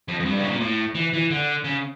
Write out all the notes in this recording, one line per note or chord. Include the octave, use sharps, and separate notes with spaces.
F2
F2
G2
C#3
A#2
A2
E3
E3
D3
C#3